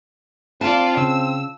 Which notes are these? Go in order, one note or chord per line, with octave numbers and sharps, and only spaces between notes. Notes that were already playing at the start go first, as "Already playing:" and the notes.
C4 F4 D5 F5 F#5 A5
C#3 E6